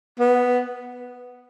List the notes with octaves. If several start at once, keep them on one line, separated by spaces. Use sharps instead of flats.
B3